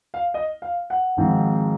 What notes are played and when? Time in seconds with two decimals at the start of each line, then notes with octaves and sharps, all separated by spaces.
0.14 F5
0.34 D#5
0.62 F5
0.90 F#5
1.17 G#1 G#2 F3 C4